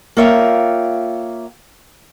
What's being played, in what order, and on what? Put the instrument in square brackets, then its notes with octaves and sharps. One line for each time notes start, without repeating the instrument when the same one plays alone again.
[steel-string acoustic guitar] A#3 F4 C#5 E5 F5 G5